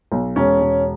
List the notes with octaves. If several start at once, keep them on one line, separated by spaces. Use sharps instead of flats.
B1
E1 C#4
E1